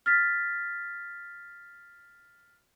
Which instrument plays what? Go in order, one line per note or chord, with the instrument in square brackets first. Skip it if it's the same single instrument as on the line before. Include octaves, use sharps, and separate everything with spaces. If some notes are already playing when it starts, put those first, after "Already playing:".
[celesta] F6 A6 B6